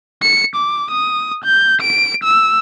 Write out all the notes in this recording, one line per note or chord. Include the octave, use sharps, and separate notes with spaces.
C#7
D6
D#6
G6
D7
E6